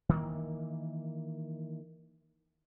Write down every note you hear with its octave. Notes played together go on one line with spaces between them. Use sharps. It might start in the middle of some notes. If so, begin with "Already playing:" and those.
D#3 E3 A#3